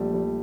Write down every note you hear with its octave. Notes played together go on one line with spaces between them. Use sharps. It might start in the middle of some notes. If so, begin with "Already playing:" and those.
Already playing: A#1 G3 A3
G3